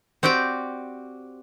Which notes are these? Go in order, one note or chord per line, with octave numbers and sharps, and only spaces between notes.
C4 F#4 G4 D5 G5